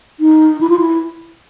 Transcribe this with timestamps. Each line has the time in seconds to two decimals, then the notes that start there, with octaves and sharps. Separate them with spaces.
0.20 D#4
0.61 E4
0.69 F4
0.79 E4